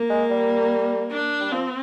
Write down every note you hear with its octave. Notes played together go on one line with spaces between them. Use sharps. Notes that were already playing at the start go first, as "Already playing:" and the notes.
Already playing: A#3
G#3
G3
D4
G3
F3 C4